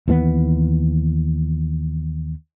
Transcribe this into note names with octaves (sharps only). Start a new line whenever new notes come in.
D#2 E3 G#3 B3